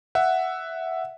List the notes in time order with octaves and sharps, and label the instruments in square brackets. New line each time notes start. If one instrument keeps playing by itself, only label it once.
[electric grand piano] E5 F#5